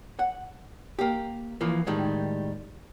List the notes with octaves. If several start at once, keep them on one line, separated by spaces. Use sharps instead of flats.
F#5
A#3 G4
E3 F3 A#3
A2 D#3 G3 G#3